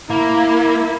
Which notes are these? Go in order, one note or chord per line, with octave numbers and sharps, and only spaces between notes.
A#3 E4